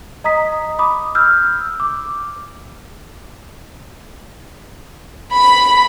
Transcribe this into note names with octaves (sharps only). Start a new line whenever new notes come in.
D#5 A#5 D#6 B6
B5 D6 D#6
E6 F6 G6
D6
B5